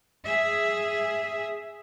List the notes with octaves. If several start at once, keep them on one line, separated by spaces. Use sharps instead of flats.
G#4 E5